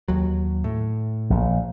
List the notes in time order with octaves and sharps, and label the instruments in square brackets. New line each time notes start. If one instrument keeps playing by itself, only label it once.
[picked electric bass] D#2 F#3
A2
[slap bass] A#1